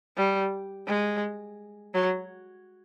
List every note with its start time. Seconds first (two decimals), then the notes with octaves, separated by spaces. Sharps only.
0.17 G3
0.87 G#3
1.94 F#3